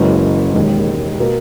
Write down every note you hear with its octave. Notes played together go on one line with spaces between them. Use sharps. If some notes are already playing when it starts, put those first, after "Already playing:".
Already playing: F#1 F#2 E3 G#3 C#4
E1 D#2 D#3 G#3
B2 A#3